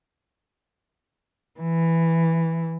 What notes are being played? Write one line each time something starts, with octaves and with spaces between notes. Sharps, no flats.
E3